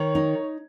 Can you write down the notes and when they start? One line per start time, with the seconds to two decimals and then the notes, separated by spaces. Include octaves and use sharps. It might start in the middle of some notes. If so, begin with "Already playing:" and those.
Already playing: D#3 C#5
0.15 D#4